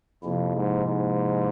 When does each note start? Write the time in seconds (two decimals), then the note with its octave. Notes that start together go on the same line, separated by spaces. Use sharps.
0.23 F2 C3 F3 A#3 E4
0.55 G#2
0.87 G#2